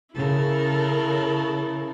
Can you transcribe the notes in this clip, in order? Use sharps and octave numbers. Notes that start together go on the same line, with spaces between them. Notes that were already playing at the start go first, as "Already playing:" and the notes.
C#3 E4 A4 A#4